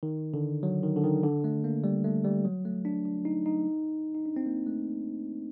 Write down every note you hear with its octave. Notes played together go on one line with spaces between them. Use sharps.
D#3
D3
F#3
D#3
D3
D#3
D3
A3
A#3
G3
A3
G3
F#3
A3
D4
D4
D#4
D#4
D#4
D4
C4
A#3
A3